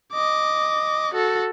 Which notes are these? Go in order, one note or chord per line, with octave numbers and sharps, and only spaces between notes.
D#5 D6
F#4 A4